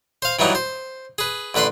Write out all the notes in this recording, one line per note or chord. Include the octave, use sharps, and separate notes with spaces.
C5 F5
G2 E3 F#3 D4 D#4
C5
G#4 B4
A1 D3 B4 B5 C6